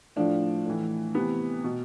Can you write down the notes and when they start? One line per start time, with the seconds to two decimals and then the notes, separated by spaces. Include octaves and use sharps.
0.16 A2 F3 D4
0.66 A2 E3
1.15 C3 E3 B3
1.64 B2